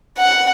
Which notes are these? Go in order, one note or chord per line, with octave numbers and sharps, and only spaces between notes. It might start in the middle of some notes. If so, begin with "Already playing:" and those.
F#5